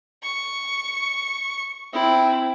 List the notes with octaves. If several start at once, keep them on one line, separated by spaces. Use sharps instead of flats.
C#6
C4 E4